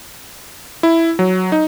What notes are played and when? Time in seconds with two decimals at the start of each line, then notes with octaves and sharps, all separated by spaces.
0.83 E4
1.19 F#3
1.52 D#4